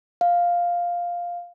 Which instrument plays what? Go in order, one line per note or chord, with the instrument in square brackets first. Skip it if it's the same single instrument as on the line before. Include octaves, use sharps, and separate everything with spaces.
[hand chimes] F5